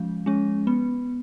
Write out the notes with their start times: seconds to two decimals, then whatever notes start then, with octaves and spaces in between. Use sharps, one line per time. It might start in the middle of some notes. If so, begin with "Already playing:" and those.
Already playing: F3 G#3 C#4
0.26 G#3 C#4
0.67 B3